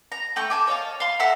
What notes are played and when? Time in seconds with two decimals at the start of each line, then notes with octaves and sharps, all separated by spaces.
0.12 A#5
0.36 A3 G5 C#6
0.50 A4 G#5 D6
0.67 C#5 D#5 F5 A5
1.00 F5 C6
1.19 A4 E5 F#5 A#5